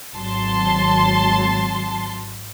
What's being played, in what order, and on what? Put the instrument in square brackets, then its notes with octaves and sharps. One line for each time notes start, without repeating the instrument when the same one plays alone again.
[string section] G#1 F#3 A5 C6